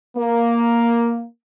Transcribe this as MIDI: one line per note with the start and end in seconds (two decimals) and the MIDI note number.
0.16 1.24 58